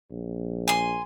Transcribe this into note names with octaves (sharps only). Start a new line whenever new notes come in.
A#1
G#5 C6